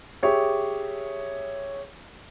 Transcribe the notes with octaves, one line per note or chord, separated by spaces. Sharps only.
G4 G#4 C#5 E5